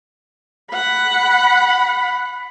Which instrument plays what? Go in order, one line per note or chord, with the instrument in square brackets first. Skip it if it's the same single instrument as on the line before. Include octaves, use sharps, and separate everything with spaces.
[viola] F#5 B5